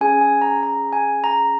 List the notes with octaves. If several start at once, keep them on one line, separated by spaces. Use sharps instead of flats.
C#4 G#4 G#5
G#5
A#5
A#5
G#5
A#5